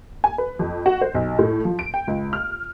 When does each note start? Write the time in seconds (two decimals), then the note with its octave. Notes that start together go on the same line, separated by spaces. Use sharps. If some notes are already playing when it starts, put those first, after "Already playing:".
0.24 G#5
0.38 B4
0.59 F2
0.86 F#4
1.01 C5
1.14 B1
1.39 A2
1.65 F3
1.79 D7
1.94 G5
2.07 C#2
2.33 F6